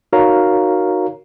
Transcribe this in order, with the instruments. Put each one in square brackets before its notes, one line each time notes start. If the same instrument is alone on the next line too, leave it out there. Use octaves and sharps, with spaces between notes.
[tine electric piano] D#4 F#4 A#4 C#5 F5 A#5